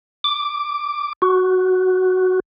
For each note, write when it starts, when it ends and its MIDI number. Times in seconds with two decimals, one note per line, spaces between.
0.24 1.13 86
1.22 2.40 66